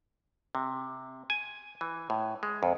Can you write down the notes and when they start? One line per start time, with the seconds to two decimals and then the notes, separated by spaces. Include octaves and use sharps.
0.55 C3
1.30 G#5
1.81 E3
2.10 A2
2.43 G#3
2.63 F2